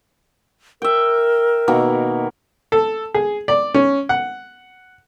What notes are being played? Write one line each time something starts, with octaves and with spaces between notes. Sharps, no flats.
A#4 E5 G5
B2 D#3 A#3
A4
G#4
D5
C#4
F#5